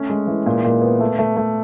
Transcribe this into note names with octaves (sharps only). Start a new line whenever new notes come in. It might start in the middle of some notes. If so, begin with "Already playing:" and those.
Already playing: A3 C#4
G#3
E3
A#2
A#2
B3
A3
A3
A3